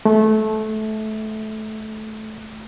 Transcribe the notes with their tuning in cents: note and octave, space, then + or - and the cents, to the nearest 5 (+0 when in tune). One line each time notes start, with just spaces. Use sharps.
A3 -20